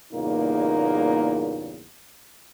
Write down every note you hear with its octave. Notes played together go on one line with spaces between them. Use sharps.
E2 G2 A#2 C#3 A#3 D#4